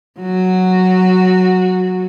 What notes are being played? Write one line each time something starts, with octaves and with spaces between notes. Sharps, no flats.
F#3 F#4